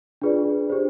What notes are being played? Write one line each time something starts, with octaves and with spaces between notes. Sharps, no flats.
D4 F4 G#4 B4 D5
D4 G4 C5